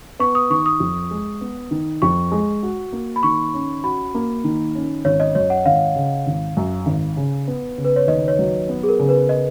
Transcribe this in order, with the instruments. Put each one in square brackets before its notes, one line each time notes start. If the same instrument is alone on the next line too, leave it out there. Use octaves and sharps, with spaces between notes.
[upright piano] B3 [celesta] C#6
[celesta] D#6
[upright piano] D#3 [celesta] C#6
[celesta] D#6
[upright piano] F2
G#3
B3
D#3
[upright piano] F2 [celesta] C#6
[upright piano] G#3
F#4
A#3
[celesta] B5
[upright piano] D#3 [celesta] C#6
[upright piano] C#4
[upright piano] F#4 [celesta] B5
[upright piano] A#3
D#3
C#4
[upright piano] G#1 [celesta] C#5
[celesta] D#5
[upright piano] F#2 [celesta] C#5
[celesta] F#5
[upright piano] G#1 [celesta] F5
[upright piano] C#3
G#1
F#2
G#1
C#3
B3
C#3
[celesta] B4
C#5
[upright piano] D#2 [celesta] D#5
[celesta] C#5
[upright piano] F#3
B3
[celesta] G#4
A#4
[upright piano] C#3
[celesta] B4
D#5